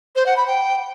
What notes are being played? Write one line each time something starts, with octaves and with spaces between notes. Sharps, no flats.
C5
F#5
B5
G5